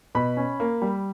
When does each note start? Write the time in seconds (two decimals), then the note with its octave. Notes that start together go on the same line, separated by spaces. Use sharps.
0.15 B2 B5
0.37 C#4
0.60 A#3
0.82 G3